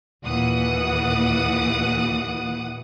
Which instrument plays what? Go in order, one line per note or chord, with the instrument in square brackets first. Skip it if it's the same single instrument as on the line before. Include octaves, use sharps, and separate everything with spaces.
[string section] D#2 A#2 E3 F#5 D#6